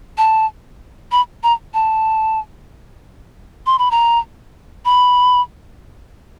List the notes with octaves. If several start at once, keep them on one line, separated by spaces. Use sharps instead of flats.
A5
B5
A#5
A5
C6
B5
A#5
B5